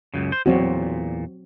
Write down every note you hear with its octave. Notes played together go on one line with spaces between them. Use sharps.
C#2 F#2 C#3
C5
E2 A#2 F#3 C4 F#4